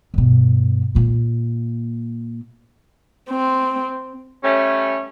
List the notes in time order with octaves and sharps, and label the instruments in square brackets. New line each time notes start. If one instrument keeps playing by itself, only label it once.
[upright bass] G2 B2
A#2 A#3
[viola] C4
[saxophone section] G3 A3 C#4